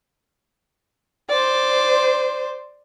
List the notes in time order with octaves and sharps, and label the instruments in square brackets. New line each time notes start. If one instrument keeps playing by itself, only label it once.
[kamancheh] C5 D5